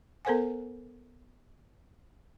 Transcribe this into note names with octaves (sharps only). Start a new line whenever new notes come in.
B3 A4 A#4 C5 F#5 G#5